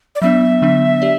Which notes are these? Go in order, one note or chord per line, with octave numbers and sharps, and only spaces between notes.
D5
F#3 B3 D4 E5
D3 F#3 B3 D4
G4 D5